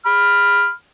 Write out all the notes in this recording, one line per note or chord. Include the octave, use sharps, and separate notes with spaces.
B5 F6